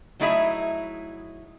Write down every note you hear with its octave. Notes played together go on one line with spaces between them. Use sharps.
F#3 A3 D#4 E4 G#4 E5